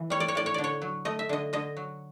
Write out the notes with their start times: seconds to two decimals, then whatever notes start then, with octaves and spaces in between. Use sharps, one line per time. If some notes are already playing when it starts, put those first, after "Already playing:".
Already playing: E3
0.10 G3 C#5
0.20 D5
0.28 C#5
0.35 A2 D5
0.46 C#5
0.54 D3 D5
0.64 C#5
0.82 F#3
1.05 A3 D#5
1.19 E5
1.29 D3 D#5
1.53 D3 D#5
1.77 F#3